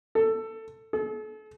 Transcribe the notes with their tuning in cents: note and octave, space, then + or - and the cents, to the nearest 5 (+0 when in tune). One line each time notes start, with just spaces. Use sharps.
A4 +15
A4 -40